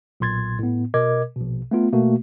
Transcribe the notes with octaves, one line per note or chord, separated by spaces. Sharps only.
B1 A#2 C6 G#6 A6
A2 B3
B2 A#4 D#5 D6 G#6
A#1 B2
A3 B3 F4
B2 A3 A#3 F#4